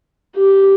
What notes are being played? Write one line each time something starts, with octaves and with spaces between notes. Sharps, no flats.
G4